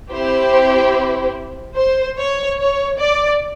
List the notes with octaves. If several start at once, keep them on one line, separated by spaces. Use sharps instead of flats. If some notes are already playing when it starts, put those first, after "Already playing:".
C4 E4 G4 C5
C5
C#5
C#5
D5